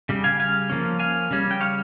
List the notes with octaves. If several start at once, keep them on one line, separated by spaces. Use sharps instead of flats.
C#3 G3
F5 G#5
F5 G#5
F3 A#3 C#4
F5 G#5
C#3 G3 C#4
G5
C#5 F5